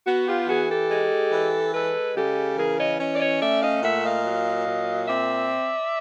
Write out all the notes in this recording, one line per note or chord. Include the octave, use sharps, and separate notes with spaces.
B3 F#4
F4 G4
E3 F#4 G#4
G4 A4
G#3
E3
G#3 A4 B4
C#3 G4 A4
E3 G#4 A#4
C#5 D#5
C#4 C#5 D#5
D5
C#5 D#5
A3 D5 E5
D#5 F5
A#2 E5 F#5
D#5 F5
F#3
A#2
C4 D5 E5